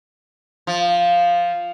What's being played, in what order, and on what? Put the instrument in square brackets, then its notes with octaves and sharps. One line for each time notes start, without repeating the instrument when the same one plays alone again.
[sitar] F3